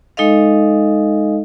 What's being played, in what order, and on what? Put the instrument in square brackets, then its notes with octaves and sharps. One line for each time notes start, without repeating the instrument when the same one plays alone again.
[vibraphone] G#3 D#4 A4 D#5 F5